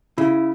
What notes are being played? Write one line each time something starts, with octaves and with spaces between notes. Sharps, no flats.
C#3 E4